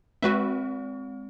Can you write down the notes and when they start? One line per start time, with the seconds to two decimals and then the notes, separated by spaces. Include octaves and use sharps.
0.23 G#3 C4 F#4 B4 E5